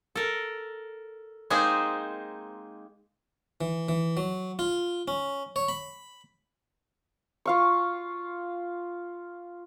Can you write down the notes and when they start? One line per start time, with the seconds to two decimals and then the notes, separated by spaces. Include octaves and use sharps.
0.15 A4 A#4
1.50 G#3 A#3 C4 D#4 G#4 C5
3.61 E3
3.89 E3
4.17 F#3
4.59 F4
5.08 C#4
5.56 C#5
5.68 B5
7.45 F4 F5 C#6